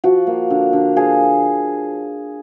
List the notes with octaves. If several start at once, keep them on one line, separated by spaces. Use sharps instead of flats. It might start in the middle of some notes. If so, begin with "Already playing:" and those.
F3 F#4
A#3
D3
D3
F3 G#4